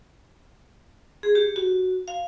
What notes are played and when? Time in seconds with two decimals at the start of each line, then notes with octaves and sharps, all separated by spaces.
1.23 G#4
1.35 G4
1.56 F#4
2.08 F5